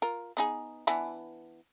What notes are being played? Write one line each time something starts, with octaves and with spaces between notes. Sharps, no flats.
F4 A#4
B3 D#4 G#4
E3 B3 D4